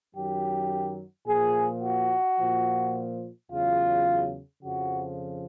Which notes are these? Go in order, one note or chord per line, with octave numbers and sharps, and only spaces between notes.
F#2 D#3 F#3 G4
A#2 F3 G#4
F#4
A#2 F3
E2 C#3 F#3 F4
F2 C#3 F3 F#4